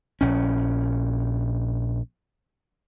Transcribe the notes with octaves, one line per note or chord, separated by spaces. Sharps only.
A#1 C#4